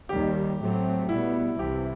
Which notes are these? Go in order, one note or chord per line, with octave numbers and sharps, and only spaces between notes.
D#2 D#3 G3 G4
A2 F#3 A3 C4
B2 G3 B3 E4
C2 C3 E3 G4